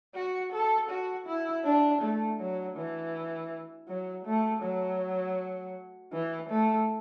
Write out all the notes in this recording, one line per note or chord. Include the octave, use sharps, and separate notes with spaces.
F#4
A4
F#4
E4
D4
A3
F#3
E3
F#3
A3
F#3
E3
A3